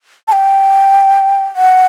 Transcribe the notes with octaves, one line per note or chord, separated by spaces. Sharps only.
A5
G5
F#5